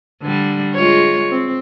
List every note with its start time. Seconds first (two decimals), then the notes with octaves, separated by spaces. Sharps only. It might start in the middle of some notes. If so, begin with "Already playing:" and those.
0.22 D3 G3
0.74 G#3 F4 C#5
1.30 C4